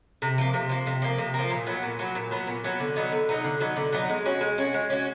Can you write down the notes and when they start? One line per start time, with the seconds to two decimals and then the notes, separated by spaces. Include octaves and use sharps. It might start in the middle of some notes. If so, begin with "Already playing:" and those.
0.22 C3
0.38 F3 A#3
0.54 C3
0.69 F3 A#3
0.87 C3
1.02 F3 A#3
1.18 C3
1.34 F3 A#3
1.50 A#2
1.66 F#3 B3
1.83 A#2
1.99 F#3 B3
2.15 A#2
2.31 F#3 B3
2.47 A#2
2.64 F#3 B3
2.80 D3
2.96 F#3 B3 D#4
3.12 D3
3.29 F#3 B3 D#4
3.44 D3
3.60 F#3 B3 D#4
3.76 D3
3.92 F#3 B3 D#4
4.10 G#3
4.26 C#4 F#4
4.41 G#3
4.58 C#4 F#4
4.74 G#3
4.90 C#4 F#4